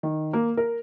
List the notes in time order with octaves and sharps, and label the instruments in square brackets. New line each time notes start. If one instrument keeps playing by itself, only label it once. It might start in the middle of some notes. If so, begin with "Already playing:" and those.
[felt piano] D#3
A#3
A#4